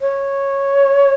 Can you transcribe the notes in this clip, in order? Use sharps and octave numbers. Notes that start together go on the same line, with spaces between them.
C#5